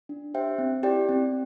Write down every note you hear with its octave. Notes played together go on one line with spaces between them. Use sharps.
D4
G4 C5 E5 G5
C4
E4 G4 D5 G5
C4